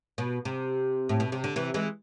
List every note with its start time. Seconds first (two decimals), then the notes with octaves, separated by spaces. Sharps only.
0.18 B2
0.45 C3
1.09 A2
1.20 B2
1.32 C3
1.44 D3
1.56 C3 E3
1.74 E3 G#3